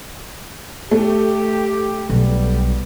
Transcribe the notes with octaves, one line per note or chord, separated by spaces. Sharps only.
A3 G4
B1 G3 B3